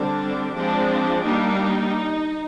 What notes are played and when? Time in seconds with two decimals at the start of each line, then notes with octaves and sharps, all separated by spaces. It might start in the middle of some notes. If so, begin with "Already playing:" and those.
Already playing: D3 G3 C4 D4
0.56 F3 G#3 C4 D4
1.24 G3 A#3 D4 D#4